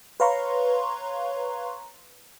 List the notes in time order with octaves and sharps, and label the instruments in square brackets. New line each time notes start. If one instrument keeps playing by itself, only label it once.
[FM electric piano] B4 C#5 F5 A#5 C6 C#6